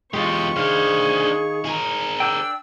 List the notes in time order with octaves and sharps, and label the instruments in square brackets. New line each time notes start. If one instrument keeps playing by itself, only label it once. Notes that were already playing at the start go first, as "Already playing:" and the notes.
[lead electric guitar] E2 G4 [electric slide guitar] G#3 F4 [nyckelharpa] C#6
[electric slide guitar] D#3 F5 [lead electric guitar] D4 C5 [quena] G#4
[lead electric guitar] G#4 A#4
[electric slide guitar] D4 G5 [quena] E6